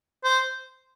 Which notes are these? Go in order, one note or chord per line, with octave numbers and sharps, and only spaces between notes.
C5